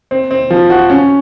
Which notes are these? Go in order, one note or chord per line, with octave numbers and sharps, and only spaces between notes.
C4
C4
F3
F#4
C#4